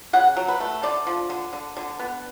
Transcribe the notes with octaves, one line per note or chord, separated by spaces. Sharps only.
C#3 F#5
F#3
B4
A3
D3 D5
F3
D3
D3
D3
B3